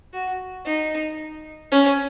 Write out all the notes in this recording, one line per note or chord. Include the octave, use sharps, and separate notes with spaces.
F#4
D#4
C#4